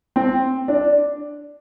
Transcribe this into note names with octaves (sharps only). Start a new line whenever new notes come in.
C4
D4